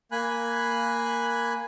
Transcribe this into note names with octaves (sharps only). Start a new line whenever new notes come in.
A#3 G#5 B5 F#6